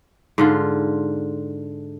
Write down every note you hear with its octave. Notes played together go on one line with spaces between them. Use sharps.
G#2 D3 F4